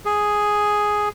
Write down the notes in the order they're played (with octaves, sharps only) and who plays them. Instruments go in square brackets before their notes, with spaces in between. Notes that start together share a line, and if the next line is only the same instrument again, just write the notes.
[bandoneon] G#4